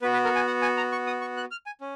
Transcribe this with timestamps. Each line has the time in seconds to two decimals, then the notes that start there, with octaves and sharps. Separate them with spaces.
0.02 B3 F#4 B4
0.13 B4
0.24 A#4
0.35 G#5
0.47 F#5
0.62 G#5
0.77 A#5
0.92 C#6
1.07 D#6
1.21 C#6
1.37 F#6
1.51 F6
1.66 G#5
1.81 C#4